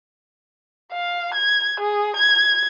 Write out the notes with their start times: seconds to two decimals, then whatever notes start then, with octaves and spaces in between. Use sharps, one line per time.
0.92 F5
1.34 G#6
1.80 G#4
2.16 G#6